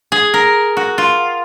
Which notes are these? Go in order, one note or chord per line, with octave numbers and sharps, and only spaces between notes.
G#4
A#4
F#4
F4